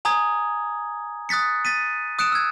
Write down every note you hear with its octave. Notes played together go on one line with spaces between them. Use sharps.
G#5 A#5 D#6 G#6
D#6 F#6 A6 B6 C#7
A6 B6 D#7
D#6 F#6 C#7 D7 E7
E6 G#6